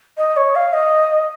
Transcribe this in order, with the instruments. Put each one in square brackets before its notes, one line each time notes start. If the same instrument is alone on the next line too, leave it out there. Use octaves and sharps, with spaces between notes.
[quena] D#5
C#5
F5
D#5